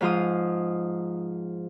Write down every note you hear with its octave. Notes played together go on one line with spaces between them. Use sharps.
G#2 F3 F4 D#6